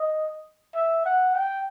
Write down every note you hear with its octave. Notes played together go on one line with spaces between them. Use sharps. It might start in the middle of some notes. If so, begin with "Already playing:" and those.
Already playing: D#5
E5
F#5
G5